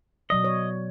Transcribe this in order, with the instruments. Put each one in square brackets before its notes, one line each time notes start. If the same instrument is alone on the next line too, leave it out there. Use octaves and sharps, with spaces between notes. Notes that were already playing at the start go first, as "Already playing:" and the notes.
[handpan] B2 F#3 D5 [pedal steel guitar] D#5
[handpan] C#5